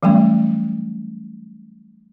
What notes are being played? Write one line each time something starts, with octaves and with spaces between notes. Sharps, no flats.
E3 F#3 G3 A3 C#4